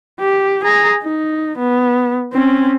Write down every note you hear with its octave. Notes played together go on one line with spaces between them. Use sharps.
G4
G#4 A#5
D#4
B3
C4 C#4